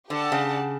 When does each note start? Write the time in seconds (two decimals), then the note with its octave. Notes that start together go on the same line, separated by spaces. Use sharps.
0.10 D3 G4 D5 F#5 A5
0.32 C#3